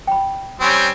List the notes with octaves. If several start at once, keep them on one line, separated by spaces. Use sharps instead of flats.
G5 B5
G3 C4 C#4